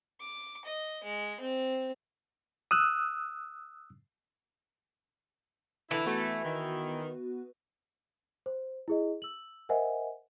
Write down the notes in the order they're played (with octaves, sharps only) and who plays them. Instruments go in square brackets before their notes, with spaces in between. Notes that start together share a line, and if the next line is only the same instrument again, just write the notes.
[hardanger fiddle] D6
D#5
G#3
C4
[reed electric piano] D#6 E6 F#6
[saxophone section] D3 E4 [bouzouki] E3
[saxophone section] A3 [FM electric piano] B3 F#4 B4
[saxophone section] D#3
[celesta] C5
E4 G#4 D#5
E6 F#7
A#4 C5 D#5 E5 F#5 G#5